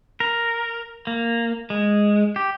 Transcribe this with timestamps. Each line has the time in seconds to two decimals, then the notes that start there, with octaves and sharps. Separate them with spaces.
0.20 A#4
1.07 A#3
1.70 G#3
2.36 G4